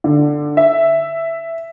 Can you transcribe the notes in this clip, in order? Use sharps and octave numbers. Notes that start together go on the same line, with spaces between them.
D3
E5